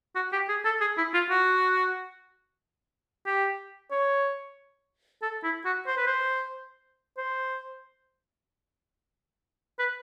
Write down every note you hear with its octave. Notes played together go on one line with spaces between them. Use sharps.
F#4
G4
G#4
A4
G#4
E4
F4
F#4
G4
C#5
A4
E4
F#4
C5
B4
C5
C5
B4